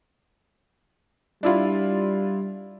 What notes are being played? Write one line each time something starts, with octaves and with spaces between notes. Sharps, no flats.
G3 D4 E4 F4